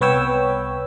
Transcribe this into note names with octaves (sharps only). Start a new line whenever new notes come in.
C2 B3 B4 C#5 G5 E6